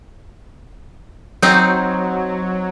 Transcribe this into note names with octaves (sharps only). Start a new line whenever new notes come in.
F#3 C4 D#4